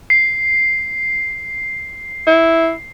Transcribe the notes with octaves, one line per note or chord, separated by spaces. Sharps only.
C7
E4